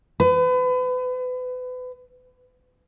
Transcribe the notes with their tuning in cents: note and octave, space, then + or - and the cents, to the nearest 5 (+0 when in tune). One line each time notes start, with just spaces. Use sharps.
B4 +35